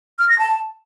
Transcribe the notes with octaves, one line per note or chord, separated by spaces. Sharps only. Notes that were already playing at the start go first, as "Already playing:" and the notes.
F6
A#6
A5